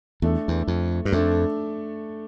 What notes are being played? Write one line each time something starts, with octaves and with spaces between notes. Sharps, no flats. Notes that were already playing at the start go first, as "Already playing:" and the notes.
E2 A3 D4 A4
E2
F2
G2
F2 A3 D4 A4